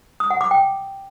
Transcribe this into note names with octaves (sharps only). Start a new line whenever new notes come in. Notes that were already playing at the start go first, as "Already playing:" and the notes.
D#6
F#5
D6
G5